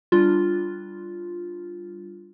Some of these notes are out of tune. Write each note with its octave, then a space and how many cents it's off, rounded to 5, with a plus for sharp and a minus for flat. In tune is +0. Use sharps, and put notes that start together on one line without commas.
G3 +0 D4 +15 F4 +0